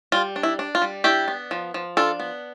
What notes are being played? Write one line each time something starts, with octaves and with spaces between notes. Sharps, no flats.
G3 F4
D4
E4
D4
F4
G3
D4 E4 G4
B3
F3
F3
D4 F4 A4
B3